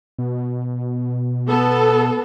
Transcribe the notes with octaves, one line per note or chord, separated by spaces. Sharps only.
B2
B3 A4